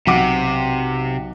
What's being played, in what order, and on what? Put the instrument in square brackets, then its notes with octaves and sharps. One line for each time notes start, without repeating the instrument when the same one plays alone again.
[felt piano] B1 F#5 D6 [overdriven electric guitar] C3